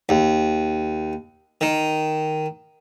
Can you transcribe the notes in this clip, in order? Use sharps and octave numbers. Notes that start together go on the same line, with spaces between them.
D#2
D#3